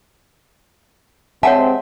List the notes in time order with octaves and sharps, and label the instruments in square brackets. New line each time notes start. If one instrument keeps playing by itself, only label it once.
[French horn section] C3 G#3 C4 [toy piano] C#5 F#5 A5 [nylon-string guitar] E5